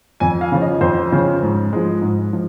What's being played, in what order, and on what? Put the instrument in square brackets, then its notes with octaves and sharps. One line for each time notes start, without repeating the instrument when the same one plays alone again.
[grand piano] F2 G#5
F5
C#3 F3
D#5
F2 C5
C#3 F3
G#2
F3 G#3
G#2
F3